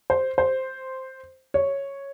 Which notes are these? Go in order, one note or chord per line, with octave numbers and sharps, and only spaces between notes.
C5
C5
C#5